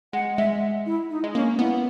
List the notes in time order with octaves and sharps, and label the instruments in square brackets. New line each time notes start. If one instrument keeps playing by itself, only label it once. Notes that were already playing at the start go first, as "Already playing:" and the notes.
[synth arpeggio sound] G#3 [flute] F#5
[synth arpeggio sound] G#3 [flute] E5
[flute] E4
D#4
[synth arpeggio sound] G#3
[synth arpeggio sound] A#3 [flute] C#4
[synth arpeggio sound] B3 [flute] E4